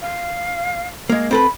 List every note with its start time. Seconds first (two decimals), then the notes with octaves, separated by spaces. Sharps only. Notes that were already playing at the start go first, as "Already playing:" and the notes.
0.01 F5
1.09 G#3 A#3 F5
1.31 C4 A4 B4 B5